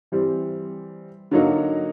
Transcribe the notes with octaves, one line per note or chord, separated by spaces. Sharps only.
E3 G3 C4
D3 F#3 A#3 D#4 F#4